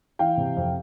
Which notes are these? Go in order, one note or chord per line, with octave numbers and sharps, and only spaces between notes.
E3 F5 G5
C3
F2